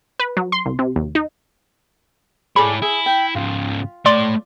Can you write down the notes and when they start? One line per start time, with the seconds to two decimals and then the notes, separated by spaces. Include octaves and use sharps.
0.19 B4
0.37 F#3
0.52 C6
0.65 C2
0.79 C3
0.96 D#2
1.15 D#4
2.56 E4 G#4 A4 C#5 D5 B5
2.82 E4 G#4
3.06 G5
3.35 G#2 C#3 F4
4.06 A3 C#5 D5 C6 D6